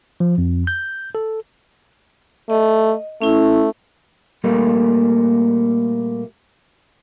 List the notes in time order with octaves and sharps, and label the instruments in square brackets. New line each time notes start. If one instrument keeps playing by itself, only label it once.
[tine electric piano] F3
F2
G6
A4
[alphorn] A3 [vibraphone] D#5
[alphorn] A3 [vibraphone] C#4 E4
[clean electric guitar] A#2 G3 A3 A#3